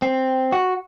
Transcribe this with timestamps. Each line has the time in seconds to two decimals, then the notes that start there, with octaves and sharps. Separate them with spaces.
0.02 C4
0.52 F#4